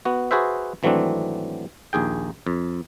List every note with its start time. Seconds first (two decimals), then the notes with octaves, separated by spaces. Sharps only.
0.05 B3 F#4
0.31 F#4 G#4 B4 C5 E5
0.83 G#1 E3 F#3 A3 C4 D4
1.93 A#1 D#2 G#4 G5
2.47 F2